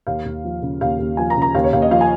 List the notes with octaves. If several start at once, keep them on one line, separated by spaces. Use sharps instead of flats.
D#2 F5
D#2
F3
C#3
D#2 F5
D#2
F3 G#5
A#5
C#3
A#5
D#2 F5
C#5
D#2 F5
D#5
F3 F5
G#5